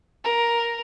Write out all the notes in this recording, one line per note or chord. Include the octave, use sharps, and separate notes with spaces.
A#4